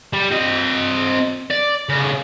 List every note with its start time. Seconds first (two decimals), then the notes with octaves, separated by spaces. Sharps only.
0.13 G3
0.31 C4 D#5
1.51 D5
1.89 A2 C#3